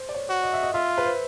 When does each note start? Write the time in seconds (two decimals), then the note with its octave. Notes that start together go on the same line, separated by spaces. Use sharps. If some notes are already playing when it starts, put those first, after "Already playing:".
Already playing: C5
0.09 D5
0.15 C#5
0.29 F#4
0.43 D#5
0.53 E5
0.63 D#5
0.74 F4 E5
0.98 B4
1.04 C5